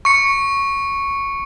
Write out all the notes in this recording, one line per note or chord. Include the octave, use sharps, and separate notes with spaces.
C#6 C#7